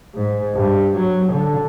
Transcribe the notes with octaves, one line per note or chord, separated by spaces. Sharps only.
G#2
G2
F#3
D3